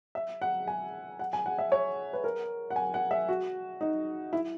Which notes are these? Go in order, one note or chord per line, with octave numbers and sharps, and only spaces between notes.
E5
F#5
G#5
F#5
G#5
F#5
E5
C#5
B4
A#4
F#5
G#5
F#5
E5
F#4
D#4
E4